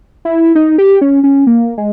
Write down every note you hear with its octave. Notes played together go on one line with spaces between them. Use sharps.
E4
D#4
G4
C#4
C#4
A#3
G#3